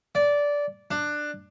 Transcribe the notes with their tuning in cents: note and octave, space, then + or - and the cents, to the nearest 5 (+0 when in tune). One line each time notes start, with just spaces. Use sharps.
D5 -15
D4 +15